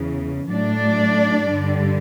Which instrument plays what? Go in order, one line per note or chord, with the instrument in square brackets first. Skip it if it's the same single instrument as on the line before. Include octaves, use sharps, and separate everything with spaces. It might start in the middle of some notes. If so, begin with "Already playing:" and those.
Already playing: [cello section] E2 C#3 E3
A2 F#3 A3 D4 D5
G2 D3 G3